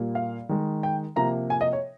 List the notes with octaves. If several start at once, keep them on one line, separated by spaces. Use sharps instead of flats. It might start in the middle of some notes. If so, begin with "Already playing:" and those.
Already playing: A#2 G3 A#3
F5
D#3 G#3
G5
C3 F3 A#3 A#5
G#5
D#5
C#5